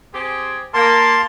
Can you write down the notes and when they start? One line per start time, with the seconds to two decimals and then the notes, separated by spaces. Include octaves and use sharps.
0.14 C4 G4 G#4
0.74 A#3 A5 C6